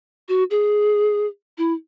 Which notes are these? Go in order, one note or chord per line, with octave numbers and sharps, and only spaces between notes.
F#4
G#4
E4